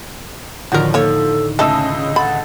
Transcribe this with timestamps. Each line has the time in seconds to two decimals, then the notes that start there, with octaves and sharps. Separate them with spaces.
0.72 A2 D3 D#3 F3 F#4 A#4
0.94 A#3 A4 C#5
1.59 C#2 A3 C#4 D#4 A4 D#5 E6
1.96 C#3
2.16 A4 E5 F#5 B5